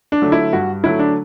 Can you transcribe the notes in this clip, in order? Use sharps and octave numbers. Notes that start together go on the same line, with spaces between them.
D4
D3 F#3 A3
E4
G2 F#4
D3 F#3 A3 E4
D4